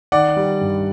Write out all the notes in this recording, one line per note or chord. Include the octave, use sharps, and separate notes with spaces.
D#3 D5 F#5
G3
G2